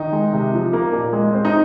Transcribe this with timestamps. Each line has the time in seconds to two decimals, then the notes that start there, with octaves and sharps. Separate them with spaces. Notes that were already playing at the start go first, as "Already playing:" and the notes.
Already playing: D#3 D#4
0.12 G#3
0.33 C3
0.53 F3
0.73 A#3
0.93 A#2
1.13 G#3
1.33 C4
1.45 D#4